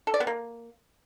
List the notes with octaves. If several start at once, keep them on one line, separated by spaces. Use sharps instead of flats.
A4
D5
B3
A#3